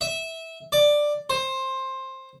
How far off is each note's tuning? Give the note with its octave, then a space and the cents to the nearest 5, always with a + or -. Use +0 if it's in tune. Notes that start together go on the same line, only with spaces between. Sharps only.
E5 -15
D5 +10
C5 +15